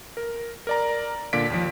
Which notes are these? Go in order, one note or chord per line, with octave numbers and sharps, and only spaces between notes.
A#4
A#4 D5 A#5
A#2 D3 A#3 D5 B6 D7
D#2 F3